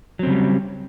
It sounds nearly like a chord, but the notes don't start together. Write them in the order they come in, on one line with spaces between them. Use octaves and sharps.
F#3 C4 C#3 G3